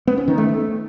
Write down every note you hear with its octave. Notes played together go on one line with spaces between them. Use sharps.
B3
C#4
D#3
A3